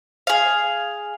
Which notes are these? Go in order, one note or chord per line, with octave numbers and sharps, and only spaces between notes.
G#4 F5